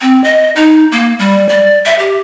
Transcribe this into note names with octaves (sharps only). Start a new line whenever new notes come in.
C4
D#5
D#4
A#3
G3
D5
E5
G4